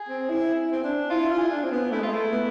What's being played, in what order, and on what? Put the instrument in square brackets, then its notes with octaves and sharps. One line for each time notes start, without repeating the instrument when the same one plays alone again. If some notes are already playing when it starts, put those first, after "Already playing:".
Already playing: [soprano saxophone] G#4
[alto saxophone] C4
E4
C4
D4
[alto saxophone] E4 [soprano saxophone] F4
[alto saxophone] F4
[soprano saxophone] G#4
[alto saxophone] D4
C4
B3
[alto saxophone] A3 [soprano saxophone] E4
[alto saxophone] G#3 [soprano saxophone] F4
[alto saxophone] A3 [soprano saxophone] E4
[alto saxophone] B3